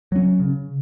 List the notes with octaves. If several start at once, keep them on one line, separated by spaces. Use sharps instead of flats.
F#3 C#4
C#3